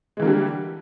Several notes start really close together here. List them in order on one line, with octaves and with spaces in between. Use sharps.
G#3 E3 A#3 D3 G3